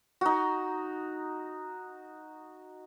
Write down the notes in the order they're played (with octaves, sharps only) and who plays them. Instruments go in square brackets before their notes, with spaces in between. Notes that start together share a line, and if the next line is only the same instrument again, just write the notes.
[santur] D#4 F#4